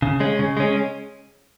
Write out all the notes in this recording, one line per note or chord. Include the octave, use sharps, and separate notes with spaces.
C#3
G#3 C#4
C#3
G#3 C#4